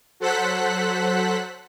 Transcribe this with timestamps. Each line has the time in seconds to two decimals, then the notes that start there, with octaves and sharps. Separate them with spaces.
0.20 F#3 A4 C5 F#5 F#6 B6